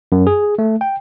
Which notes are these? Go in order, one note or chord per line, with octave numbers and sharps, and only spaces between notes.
F#2
G#4
A3
G5